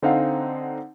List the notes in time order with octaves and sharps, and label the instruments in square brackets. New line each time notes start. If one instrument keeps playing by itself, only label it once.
[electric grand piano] D3 C4 D#4 F5 F#5